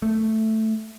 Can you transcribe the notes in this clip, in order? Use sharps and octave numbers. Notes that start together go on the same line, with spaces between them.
A3